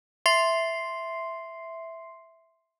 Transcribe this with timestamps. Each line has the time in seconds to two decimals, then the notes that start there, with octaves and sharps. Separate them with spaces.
0.26 E5 C6 C7